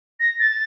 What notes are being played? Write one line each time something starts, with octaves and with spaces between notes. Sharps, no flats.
A#6
A6